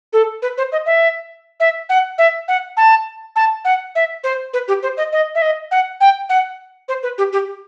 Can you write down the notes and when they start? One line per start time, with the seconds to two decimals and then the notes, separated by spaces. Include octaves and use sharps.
0.13 A4
0.42 B4
0.58 C5
0.72 D#5
0.86 E5
1.60 E5
1.89 F#5
2.18 E5
2.48 F#5
2.77 A5
3.36 A5
3.65 F#5
3.95 E5
4.24 C5
4.53 B4
4.68 G4
4.83 C5
4.97 D#5
5.12 D#5
5.35 E5
5.42 D#5
5.71 F#5
6.00 G5
6.29 F#5
6.88 C5
7.03 B4
7.18 G4
7.33 G4